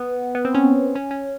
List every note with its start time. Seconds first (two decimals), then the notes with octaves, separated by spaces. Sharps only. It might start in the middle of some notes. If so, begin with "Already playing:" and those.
Already playing: B3
0.35 B3
0.45 C4
0.55 C#4
0.95 C#4
1.11 C#4